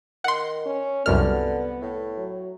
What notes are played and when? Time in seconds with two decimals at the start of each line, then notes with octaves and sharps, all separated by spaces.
0.24 D#3 F#5 C6
0.66 C#4
1.06 C2 F#2 D3 B3 F6
1.81 A2
2.18 F#3